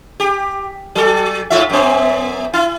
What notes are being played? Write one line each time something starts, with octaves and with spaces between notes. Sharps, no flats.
G4
F#3 A4
G#2 F4 E5
F#2 B3
E4